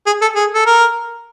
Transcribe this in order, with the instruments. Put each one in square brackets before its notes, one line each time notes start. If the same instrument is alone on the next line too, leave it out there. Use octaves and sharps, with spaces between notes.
[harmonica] G#4
A4
G#4
A4
A#4